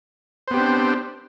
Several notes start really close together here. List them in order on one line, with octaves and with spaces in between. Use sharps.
C5 B3 G4 C4 D4